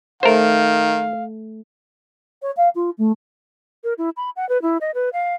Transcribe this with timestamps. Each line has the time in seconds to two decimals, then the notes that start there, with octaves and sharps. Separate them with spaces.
0.23 D#3 A3 A4 A#4 C5 E5 F5
2.42 C#5
2.57 F5
2.75 F4
2.98 A3
3.84 A#4
3.98 E4
4.17 B5
4.36 F#5
4.49 B4
4.62 E4
4.81 D#5
4.95 B4
5.13 F5